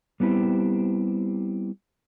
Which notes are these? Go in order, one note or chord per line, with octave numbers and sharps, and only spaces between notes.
G3 B3 C4 E4 G4